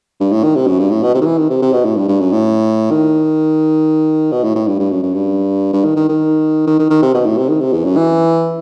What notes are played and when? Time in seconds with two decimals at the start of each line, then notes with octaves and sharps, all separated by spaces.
0.20 G2
0.32 A2
0.43 D#3
0.55 C3
0.67 F#2
0.79 G2
0.91 A2
1.03 B2
1.14 C3
1.21 D#3
1.26 E3
1.38 D#3
1.50 C3
1.62 C3
1.73 B2
1.84 A2
1.96 G2
2.08 G2
2.20 F#2
2.32 A2
2.91 D#3
4.32 B2
4.43 A2
4.55 A2
4.67 G2
4.79 G2
4.91 F#2
5.03 F#2
5.14 G2
5.73 G2
5.84 D#3
5.96 D#3
6.09 D#3
6.67 D#3
6.79 D#3
6.90 D#3
7.02 C3
7.14 B2
7.25 A2
7.37 C3
7.49 D#3
7.60 C3
7.72 E2
7.85 F#2
7.96 E3